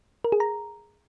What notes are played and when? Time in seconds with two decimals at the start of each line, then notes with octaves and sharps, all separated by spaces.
0.24 A#4
0.32 G#4
0.40 A#5